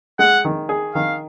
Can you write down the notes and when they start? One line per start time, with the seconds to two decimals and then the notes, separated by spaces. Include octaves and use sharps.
0.19 G#3 F#5
0.45 D#3
0.69 G#4
0.94 D#3 F5